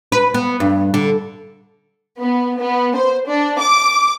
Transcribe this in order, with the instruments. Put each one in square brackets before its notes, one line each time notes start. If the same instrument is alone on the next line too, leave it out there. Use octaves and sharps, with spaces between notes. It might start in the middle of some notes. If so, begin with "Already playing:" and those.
[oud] B4
B3
G2
D3
[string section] B3
B3
C5
D4
D6